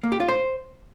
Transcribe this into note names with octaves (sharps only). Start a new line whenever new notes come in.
A#3
G4
F4
C5